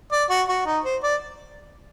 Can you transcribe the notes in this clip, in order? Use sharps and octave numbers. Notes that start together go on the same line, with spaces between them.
D5
F#4
F#4
D#4
C5
D5